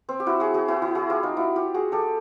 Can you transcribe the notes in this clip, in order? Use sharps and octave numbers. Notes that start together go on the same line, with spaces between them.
C4
G4
E4 F#4
F#4 G#4
F#4 G#4
E4 F#4
E4 F#4
F#4 G#4
F4 G4
D#4 F4
E4 F#4
F4 G4
F#4 G#4
G4 A4